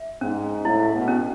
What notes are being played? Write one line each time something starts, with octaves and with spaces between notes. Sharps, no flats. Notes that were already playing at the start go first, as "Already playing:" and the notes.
Already playing: E5
G#2 C#4
A2 E4
B2
C#4